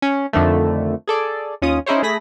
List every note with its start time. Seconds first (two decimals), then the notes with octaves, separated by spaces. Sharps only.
0.02 C#4
0.33 F2 D3 D#3 F3 A3
1.07 G#4 A4 D5
1.62 D#2 C#4 F4 D#6
1.86 C#4 D#4 E4 G#4 C5 C#5
2.03 A3 G#4 B5 A#6 B6